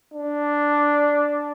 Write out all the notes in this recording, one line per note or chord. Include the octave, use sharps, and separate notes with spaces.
D4